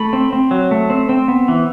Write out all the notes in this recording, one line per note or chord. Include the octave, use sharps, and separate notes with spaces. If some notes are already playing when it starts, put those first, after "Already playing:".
Already playing: A3 B5
C4
C4
F#3
A3
C4
C4
B3
E3